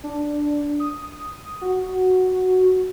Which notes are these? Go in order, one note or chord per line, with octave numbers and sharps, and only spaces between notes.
D4
D#6
F#4